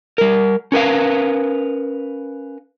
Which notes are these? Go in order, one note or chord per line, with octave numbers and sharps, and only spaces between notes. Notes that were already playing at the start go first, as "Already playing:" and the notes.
G3 A#4
C#4 A#4 B4 F5